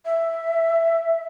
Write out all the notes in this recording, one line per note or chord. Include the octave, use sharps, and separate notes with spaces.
E5